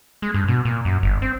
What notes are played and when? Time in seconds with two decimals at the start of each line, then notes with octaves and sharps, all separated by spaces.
0.22 G#3
0.34 G2
0.48 B2
0.65 A#2
0.85 F#2
1.03 G1
1.22 C4